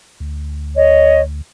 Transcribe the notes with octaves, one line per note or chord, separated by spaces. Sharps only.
D2
C#5 D#5